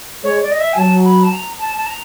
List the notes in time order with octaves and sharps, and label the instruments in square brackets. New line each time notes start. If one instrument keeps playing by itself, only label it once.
[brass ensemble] G#3 [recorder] C#5
[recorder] D5
D#5
E5
G#5
[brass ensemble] F#3 [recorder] A5
[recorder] B5
A5
A#5
A5
A5
A#5